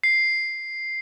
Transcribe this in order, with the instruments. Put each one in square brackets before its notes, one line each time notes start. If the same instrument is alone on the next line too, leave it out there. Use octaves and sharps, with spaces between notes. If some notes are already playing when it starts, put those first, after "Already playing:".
[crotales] C7